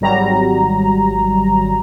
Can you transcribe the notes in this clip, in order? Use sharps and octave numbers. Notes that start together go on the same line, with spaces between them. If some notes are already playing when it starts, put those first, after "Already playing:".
G#1 F#3 G3 A#5